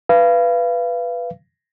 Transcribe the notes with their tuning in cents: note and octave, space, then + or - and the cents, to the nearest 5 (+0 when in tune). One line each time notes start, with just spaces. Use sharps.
B4 +0 F5 -30